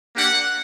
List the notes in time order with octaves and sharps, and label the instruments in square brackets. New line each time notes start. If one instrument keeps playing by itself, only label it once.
[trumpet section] A#3 D4 G4 F#5